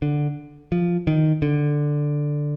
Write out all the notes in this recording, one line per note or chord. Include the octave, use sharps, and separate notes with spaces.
D3
F3
D#3
D3